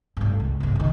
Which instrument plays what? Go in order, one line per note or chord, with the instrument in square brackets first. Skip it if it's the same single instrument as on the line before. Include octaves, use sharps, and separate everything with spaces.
[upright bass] A1 G2
C#2
C#2 G2
C3 D#3